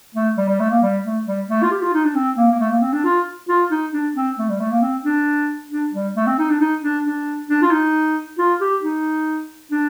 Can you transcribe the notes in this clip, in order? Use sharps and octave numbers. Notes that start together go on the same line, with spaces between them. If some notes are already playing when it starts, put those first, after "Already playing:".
A3
G3
G3
A3
A#3
G3
A3
G3
A3
F4
G4
F4
D#4
D4
C4
A#3
A#3
A3
A#3
C4
D4
F4
F4
D#4
D4
C4
A3
G3
A3
A#3
C4
D4
D4
G3
A3
C4
D#4
D4
D#4
D4
D4
D4
F4
D#4
F4
G4
D#4
D4